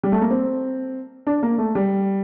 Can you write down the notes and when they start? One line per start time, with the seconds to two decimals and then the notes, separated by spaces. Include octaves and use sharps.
0.03 G3
0.12 A3
0.22 A#3
0.30 C4
1.27 D4
1.43 A#3
1.58 A3
1.75 G3